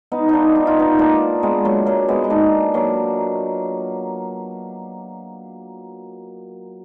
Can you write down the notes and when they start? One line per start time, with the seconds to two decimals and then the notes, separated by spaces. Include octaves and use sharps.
0.12 B3 D#4
0.29 D4 D#4 F4
0.55 D#4
0.67 F4
0.79 B3 D#4
0.99 A#3 D4
1.43 G#3 B3
1.65 F#3 A#3
1.86 F#3 A#3
2.08 G#3 B3
2.24 D#4
2.30 A#3 D4
2.74 F#3 A#3